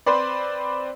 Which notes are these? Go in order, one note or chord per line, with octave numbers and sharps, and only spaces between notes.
C4 B4 C5 D5